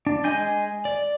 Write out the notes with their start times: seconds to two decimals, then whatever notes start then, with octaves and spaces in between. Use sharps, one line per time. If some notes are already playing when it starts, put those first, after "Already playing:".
0.07 D4
0.24 G#3 D#5 G#5 G6
0.85 D5